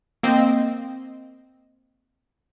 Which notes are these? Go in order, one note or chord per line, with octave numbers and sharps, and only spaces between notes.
A#3 C4 D#5